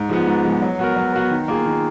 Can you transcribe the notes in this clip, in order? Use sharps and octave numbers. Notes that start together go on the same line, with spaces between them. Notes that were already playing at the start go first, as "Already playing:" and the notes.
Already playing: G#2
F3 G#3 B3
G#2
F3 G#3 B3
F#3
B3 F#4 A#4
F#3
B3 F#4 A#4
D#3
A#3 F4 G#4
D#3